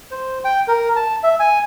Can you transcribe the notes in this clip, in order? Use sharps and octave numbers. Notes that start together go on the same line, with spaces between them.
C5
G5
A#4
A5
E5
G#5